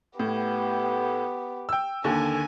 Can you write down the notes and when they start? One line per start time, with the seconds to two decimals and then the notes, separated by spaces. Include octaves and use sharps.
0.19 A2 B3 G4
1.69 G5 E6
2.04 D#2 D3 D#3 G#5